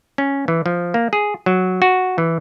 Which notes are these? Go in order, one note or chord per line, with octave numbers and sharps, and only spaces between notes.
C#4
E3
F3
A#3
G#4
F#3
F#4
E3